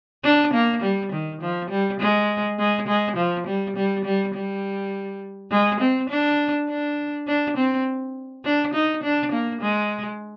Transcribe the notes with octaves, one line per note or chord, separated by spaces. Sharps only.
D4
A#3
G3
D#3
F3
G3
G#3
G#3
G#3
F3
G3
G3
G3
G3
G#3
C4
D4
D4
D4
C4
D4
D#4
D4
A#3
G#3